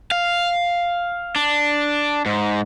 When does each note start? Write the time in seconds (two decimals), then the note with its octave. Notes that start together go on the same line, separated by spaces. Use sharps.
0.11 F5
1.36 D4
2.26 G#2